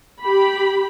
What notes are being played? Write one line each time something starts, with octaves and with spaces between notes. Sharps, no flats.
G4 B5